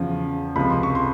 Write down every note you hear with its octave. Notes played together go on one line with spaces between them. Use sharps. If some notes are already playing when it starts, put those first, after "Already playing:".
Already playing: E2 C#3 F3
C#2 C3 F3 B5
C6
C#6
C6